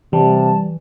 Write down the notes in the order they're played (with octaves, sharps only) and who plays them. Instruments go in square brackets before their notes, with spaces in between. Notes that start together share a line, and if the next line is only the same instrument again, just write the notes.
[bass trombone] C3 [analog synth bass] E3 [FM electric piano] G3 [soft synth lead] A5